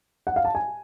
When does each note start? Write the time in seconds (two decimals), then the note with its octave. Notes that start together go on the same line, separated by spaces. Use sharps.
0.27 F#5
0.36 F5
0.45 A5
0.55 G#5